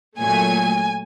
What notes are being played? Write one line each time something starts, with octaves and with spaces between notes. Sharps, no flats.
A#2 F#3 A3 G#5